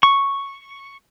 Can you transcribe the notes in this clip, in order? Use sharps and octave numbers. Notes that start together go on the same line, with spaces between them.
C#6